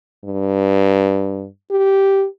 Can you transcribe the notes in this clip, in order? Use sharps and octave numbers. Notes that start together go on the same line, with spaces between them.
G2
G4